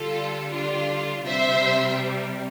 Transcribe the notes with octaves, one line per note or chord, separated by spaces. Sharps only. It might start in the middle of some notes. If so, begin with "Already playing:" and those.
Already playing: D3 G3 F4 A4
D4 F4
C3 G3 C5 E5